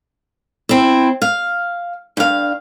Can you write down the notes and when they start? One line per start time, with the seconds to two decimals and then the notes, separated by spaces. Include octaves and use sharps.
0.69 C4 E4
1.22 F5
2.17 G2 F5